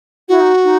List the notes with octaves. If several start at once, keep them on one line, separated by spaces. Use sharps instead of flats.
E4 F#4
D#4
D#4